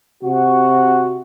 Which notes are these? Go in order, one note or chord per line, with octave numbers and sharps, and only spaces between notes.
C3 F#4